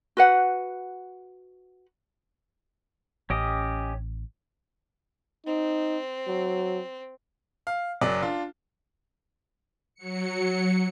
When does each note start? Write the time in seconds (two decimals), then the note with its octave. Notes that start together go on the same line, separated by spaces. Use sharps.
0.17 F#4 B4 F#5
3.30 A1 C#4 G4 D#5
5.46 C4 D#4
6.27 F#3
7.67 F5
8.01 F#1 F#3 D5
8.22 D4 F4
9.95 F#3 C#7